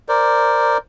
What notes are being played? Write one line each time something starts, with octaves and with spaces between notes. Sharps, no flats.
A#4 C5 D5